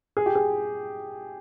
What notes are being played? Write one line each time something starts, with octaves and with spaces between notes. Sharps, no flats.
G#4
G4
G#4